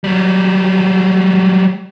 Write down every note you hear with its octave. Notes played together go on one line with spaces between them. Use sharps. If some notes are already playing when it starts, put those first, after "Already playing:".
F#3 G3